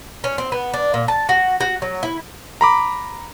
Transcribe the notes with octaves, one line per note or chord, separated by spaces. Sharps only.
C#4
C4
B3
D4
A#2
A5
F#4
F#4
F#3
E4
A#5 B5 D6